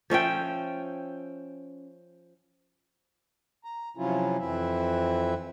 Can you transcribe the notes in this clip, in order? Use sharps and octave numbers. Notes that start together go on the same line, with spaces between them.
F3 C#4 E5 G5
A#5
C3 F3 F#3 C#4 E4 F4
F2 E3 C4 E4 E5